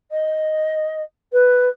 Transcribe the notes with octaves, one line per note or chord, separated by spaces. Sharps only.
D#5
B4